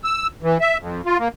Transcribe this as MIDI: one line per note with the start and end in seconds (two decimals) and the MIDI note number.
0.04 0.27 88
0.43 0.58 52
0.61 0.77 76
0.79 1.01 41
1.05 1.18 65
1.19 1.28 58